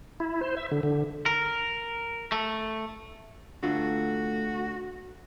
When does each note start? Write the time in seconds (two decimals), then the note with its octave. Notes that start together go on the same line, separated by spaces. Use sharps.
0.20 E4
0.41 C5
0.57 E5
0.71 D3
0.83 D3
1.26 A#4
2.32 A3
3.63 D3 A3 D4 F4 F#4